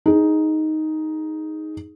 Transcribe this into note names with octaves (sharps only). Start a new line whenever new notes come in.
D#4 G#4